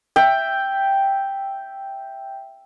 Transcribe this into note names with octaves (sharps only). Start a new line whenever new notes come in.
E5 G5